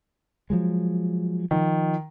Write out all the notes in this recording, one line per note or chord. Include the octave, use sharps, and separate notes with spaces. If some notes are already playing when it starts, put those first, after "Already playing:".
F3 F#3 G#3
D#3 F3